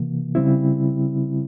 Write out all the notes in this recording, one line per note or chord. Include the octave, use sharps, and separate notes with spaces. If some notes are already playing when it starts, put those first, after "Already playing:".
Already playing: C3 E3 A#3
C#3 G3 C4 E4